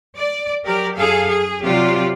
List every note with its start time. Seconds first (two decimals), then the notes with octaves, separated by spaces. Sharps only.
0.18 D5
0.65 F#3 G4 A#4 D5
0.97 F#2 G#4 A4 F5
1.28 G#4
1.63 C3 F#3 F4 G4 D5